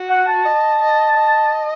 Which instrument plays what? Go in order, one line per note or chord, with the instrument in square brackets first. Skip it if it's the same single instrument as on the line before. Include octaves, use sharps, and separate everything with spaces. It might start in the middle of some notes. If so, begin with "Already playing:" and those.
Already playing: [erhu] F#4
[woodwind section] F#5
A5
[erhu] D#5
D#5
D#5